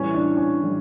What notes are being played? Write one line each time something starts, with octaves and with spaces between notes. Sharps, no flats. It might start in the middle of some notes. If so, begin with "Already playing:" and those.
Already playing: A2 E3 G3 C#4
D4
C#4
A2 E3 G3